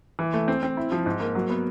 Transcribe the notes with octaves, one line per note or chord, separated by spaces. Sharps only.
E3
A3
C4
C4
E4
F3
G#2
A#3
F#3
B3